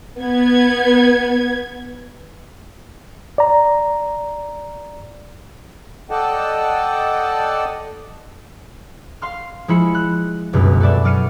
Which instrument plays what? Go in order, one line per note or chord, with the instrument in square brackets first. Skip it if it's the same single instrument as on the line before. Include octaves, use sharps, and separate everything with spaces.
[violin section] B3 G#6
[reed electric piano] D5 A#5
[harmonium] A4 D5 D#5 F#5 G5 A5
[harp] F5 C6 F6
F3 G#3 E4 B5 C#7
F#6
G1 C#2 F#2 B2
F#4 A4 B4 D5 E5
F#3 D5 F6 C#7 D#7